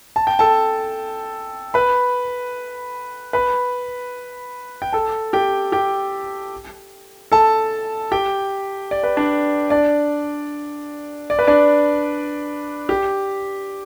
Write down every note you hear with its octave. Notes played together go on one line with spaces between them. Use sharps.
A5
G5
A4 A5
B4 B5
B4 B5
G5
A4 A5
G4 G5
G4 G5
A4 A5
G4 G5
D5
B4
D4 D5
D4 D5
D5
B4
D4 D5
G4